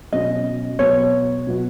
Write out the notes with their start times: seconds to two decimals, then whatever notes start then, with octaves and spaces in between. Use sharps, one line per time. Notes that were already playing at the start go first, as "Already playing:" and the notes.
0.13 B2 F#3 C#4 D#5
0.79 B2 F#3 B3 F#4 C#5
1.47 B2 F#3 B3 F#4